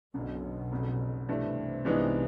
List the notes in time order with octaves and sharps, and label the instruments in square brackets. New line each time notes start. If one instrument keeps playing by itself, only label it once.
[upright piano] F#1 F#2 D3 [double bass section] B1 B2
[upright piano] F1 F2 C#3
[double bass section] C2 C3 [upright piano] G2 E3 A3
[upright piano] G2 E3 G#3 B3 D#4